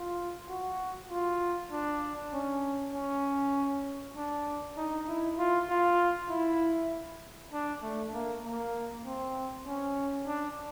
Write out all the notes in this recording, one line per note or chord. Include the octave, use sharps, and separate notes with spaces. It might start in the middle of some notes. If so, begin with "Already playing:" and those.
Already playing: F4
F#4
F4
D4
C#4
C#4
D4
D#4
E4
F4
F4
E4
D4
A3
A#3
A#3
C4
C#4
D4